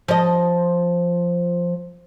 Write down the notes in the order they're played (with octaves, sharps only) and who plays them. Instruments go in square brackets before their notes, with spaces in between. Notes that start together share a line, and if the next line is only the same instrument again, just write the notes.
[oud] F3 D#5